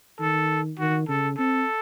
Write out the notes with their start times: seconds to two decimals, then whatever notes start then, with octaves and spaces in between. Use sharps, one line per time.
0.20 D#3 A4
0.79 D#3 F#4
1.08 C#3 A4
1.38 C4 A4